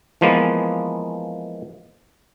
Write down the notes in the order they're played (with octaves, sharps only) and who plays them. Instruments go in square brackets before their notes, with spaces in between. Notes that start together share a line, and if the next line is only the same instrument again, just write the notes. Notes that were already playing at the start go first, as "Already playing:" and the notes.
[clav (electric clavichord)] E3 F3 G#3 A#3 B3